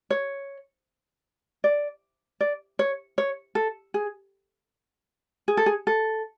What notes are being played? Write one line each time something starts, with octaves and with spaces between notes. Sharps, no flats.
C#5
D5
D5
C#5
C#5
A4
G#4
G#4
A4
G#4
A4